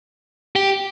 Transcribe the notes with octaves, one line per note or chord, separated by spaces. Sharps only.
G4